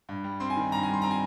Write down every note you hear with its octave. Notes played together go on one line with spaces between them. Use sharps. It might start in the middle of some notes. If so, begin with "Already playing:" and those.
G2
G3
C4 C6
G#5
D#3
G2 A#5
G#5
G3 C6
C4 A#5
G#5